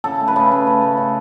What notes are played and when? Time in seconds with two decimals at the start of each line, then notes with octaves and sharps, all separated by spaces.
0.04 C#3 A4
0.21 A3
0.28 B4
0.36 C#3 A4
0.52 A3
0.67 C#3
0.82 A3
0.97 C#3